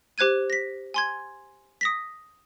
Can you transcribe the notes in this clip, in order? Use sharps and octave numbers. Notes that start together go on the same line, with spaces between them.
G4 C5 F#6 G#6 D#7
A#6 B6
G#5 C6 G#6
D#6 A#6 B6